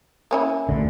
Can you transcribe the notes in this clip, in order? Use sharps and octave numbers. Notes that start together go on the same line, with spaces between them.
A#3 C#4 E4
D2 D3